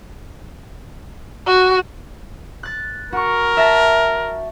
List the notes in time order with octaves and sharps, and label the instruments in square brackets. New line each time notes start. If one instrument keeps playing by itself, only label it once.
[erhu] F#4
[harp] F#6 A6
[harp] F#4 C#6 [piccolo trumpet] A#4
[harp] E5 A5 A#6